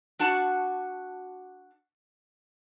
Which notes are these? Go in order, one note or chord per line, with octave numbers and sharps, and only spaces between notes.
D4 F#4 F#5 A5